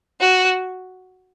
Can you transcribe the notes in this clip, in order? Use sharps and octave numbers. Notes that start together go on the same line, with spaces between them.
F#4